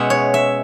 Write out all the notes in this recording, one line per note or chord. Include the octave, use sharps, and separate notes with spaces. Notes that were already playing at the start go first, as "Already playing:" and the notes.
Already playing: B2 G#3 C#4 E5 F#5 G#5
C#5
E5